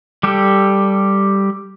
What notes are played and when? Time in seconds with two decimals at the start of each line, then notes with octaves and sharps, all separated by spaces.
0.23 G3 G4 A4